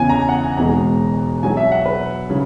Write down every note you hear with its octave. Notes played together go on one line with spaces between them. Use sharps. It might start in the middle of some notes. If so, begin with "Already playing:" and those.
Already playing: E2 C#3 E3 B3 G#5
A#5
G#5
F#5
G#5
E1 E2 B2 G#3 D#4 A#5
E2 B2 F#3 B3 G#5
E5
F#5
B4
C#3 F#3